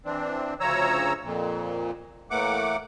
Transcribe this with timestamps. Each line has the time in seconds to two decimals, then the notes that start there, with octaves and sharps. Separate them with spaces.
0.05 E3 C4 D4
0.60 D2 C#3 F3 C#5 A#5 E6
1.24 F2 A#2
2.31 A2 E3 A3 A#3 F#5 D6